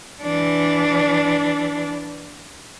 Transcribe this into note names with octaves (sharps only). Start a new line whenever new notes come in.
E3 D4